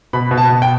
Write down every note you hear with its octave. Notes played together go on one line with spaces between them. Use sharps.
B2 B5
B2
A5
B2
G5